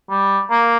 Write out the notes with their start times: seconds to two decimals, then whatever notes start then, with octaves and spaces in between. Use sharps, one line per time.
0.10 G3
0.50 A#3